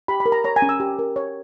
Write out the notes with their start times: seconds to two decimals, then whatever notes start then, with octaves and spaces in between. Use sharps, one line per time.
0.08 G4 B5
0.20 B5
0.26 A#4
0.32 A#5
0.44 C#5 A#5
0.56 G#5
0.62 C#4
0.69 E6
0.80 G4
0.99 A#4
1.16 C#5